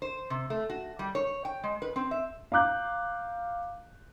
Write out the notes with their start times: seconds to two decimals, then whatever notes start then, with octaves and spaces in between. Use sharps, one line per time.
0.02 C5
0.30 C3
0.50 A3
0.70 F#4
0.99 G3
1.15 C#5
1.45 G5
1.63 G#3
1.82 B4
1.96 C4
2.11 E5
2.52 F5 A#5 D6 F#6 G6